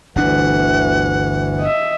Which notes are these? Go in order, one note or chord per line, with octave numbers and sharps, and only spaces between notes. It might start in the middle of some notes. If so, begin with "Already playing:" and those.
G1 D2 B2 E3 D4 F#5
D#5 E5